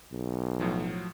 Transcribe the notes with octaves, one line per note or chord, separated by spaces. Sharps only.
B1
A2 F3 F#3